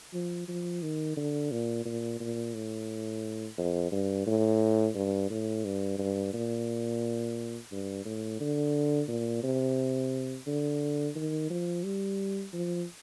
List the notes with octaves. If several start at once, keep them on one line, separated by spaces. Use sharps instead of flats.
F3
F3
D#3
D3
A#2
A#2
A#2
A2
F2
G2
A2
G2
A2
G2
G2
A#2
G2
A2
D3
A#2
C3
D3
D#3
F3
G3
F3